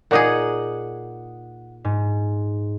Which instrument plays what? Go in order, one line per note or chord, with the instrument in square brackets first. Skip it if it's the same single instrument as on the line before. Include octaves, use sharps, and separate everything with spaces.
[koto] A#2 D#4 G#4 [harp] F#5 D6 D#6
[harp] G#2